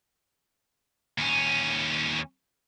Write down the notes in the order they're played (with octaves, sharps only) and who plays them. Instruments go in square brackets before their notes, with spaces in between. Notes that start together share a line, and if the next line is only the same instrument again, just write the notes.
[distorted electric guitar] D#2 C#4